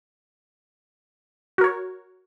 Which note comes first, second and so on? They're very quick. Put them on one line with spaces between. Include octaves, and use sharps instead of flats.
F#4 A#4 C#5